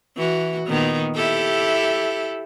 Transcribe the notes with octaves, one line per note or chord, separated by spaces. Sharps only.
E3 F#4
A#2 D#3 B3
E4 G4 A4